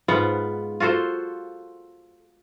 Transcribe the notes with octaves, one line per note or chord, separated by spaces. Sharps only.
G#2 B3 F4 F#5
F4 F#4 A4 C5